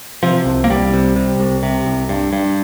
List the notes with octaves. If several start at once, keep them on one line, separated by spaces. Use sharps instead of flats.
C3 F3
C2
A#3
C2 G3
C3
C3
C2
C3
C2
G2
G2